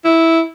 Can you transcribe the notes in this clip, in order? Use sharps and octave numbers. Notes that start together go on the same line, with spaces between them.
E4